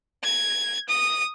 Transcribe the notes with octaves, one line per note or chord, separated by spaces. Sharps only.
G#6
D#6